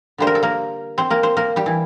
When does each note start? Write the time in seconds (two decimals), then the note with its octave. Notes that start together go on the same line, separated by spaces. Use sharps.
0.18 D3 G3 A#3 C5
0.27 A#4
0.35 A4
0.43 A#3 A#4
0.98 C4 C5
1.10 A#3 A#4
1.23 C4 C5
1.37 A#3 A#4
1.56 G3 G4
1.66 E3 E4